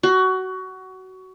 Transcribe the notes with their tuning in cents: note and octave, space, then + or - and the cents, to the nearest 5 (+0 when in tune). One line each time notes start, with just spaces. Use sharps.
F#4 +20